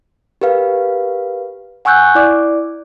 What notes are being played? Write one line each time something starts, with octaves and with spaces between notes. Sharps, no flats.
G4 A#4 B4 F5
F#5 G#5 C#6 E6 F#6 G6
E4 D5 D6